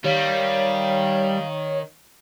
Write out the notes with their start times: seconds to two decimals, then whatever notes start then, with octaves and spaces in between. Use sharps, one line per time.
0.05 D#3 G3 C#5 F5